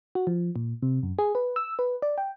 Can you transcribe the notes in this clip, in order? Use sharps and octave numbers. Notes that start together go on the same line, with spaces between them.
F#4
F3
A#2
C3
F#2
G#4
B4
E6
B4
D5
G5